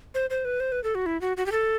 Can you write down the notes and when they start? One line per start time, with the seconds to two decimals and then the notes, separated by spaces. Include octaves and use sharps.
0.15 C5
0.30 C5
0.45 B4
0.60 C5
0.72 B4
0.84 A4
0.95 F#4
1.06 E4
1.21 F#4
1.37 F#4
1.46 G4
1.52 A4